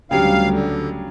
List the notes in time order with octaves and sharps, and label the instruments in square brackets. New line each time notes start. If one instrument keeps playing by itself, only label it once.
[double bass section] D2 G3 [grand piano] C#3 F#3 D4 [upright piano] G4 [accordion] F5
[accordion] D3